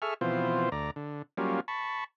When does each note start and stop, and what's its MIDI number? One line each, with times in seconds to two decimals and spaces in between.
0.02 0.14 68
0.02 0.14 69
0.02 0.14 76
0.02 0.14 85
0.02 0.14 89
0.21 0.69 47
0.21 0.69 52
0.21 0.69 53
0.21 0.69 60
0.21 0.69 65
0.21 0.69 72
0.72 0.91 38
0.72 0.91 74
0.72 0.91 82
0.96 1.22 50
1.37 1.60 54
1.37 1.60 55
1.37 1.60 58
1.37 1.60 61
1.37 1.60 65
1.68 2.04 81
1.68 2.04 83
1.68 2.04 85